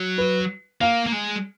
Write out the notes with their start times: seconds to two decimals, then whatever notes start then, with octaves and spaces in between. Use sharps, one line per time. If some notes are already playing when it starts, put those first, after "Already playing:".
Already playing: F#3
0.18 B4
0.81 A#3 F5
1.07 A#3
1.12 G#3